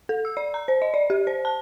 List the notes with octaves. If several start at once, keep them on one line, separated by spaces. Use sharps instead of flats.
A4
E6
D5
A#5
C5
D#5
D5
G4
C5
A5